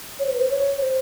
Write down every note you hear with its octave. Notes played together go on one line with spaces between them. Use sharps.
C#5
C5
B4
C5
C#5
C5